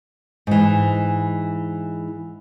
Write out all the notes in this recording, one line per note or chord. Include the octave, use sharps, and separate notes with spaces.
G#2 E3